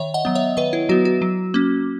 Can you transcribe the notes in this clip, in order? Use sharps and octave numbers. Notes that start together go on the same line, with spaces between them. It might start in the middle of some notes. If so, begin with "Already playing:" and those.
Already playing: D#3 C#5 E5
D#5 F#5
F#3 B3
C#5 E5
D#3 B4 D#5
E4
F#3 B3 F#4
F#4
F#3
A#3 C#4